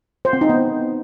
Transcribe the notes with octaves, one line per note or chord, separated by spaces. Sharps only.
C5
C4
D#4
B3